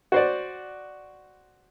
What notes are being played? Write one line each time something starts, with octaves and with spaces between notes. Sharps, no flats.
F#4 C5 D5